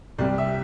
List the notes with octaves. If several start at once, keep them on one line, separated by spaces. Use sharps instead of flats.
C2 C3 G3 D5
E5